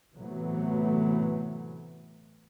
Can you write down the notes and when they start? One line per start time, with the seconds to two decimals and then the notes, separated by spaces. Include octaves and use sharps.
0.15 A2 C3 E3 F#3 A3 B3